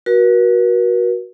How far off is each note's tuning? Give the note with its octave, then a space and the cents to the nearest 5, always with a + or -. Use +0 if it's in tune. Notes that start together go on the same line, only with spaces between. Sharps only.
F#4 +0 A#4 +45